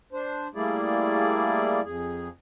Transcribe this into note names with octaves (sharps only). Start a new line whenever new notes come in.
D4 C5
G3 A3 A#3 E4 G#4 D5
F2 G#4